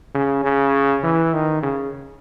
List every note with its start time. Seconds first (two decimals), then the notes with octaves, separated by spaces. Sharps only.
0.15 C#3
0.44 C#3
1.04 E3
1.34 D#3
1.63 C#3